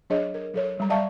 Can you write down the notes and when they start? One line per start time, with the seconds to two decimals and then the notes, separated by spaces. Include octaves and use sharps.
0.10 F#3 D4 G#4 C#5 D#5
0.34 A#4
0.54 F#3 A4 C#5
0.78 F#3 G3 A#5
0.90 G3 D5 E5 F5 A5 C#6